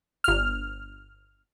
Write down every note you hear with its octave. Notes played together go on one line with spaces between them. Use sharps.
G1 F6